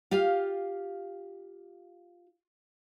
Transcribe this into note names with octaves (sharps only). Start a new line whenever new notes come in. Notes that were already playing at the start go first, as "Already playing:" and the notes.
F4 G4 F5